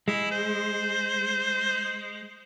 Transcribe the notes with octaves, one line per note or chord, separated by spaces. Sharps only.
G#3 E4
C5